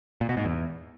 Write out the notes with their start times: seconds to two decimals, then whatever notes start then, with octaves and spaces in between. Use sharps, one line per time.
0.21 A#2
0.29 B2
0.37 G#2
0.45 E2